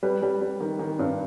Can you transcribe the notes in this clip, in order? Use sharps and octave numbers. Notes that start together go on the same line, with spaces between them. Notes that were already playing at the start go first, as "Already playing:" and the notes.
G3 B4
G3
G3
D#3
D#3
G2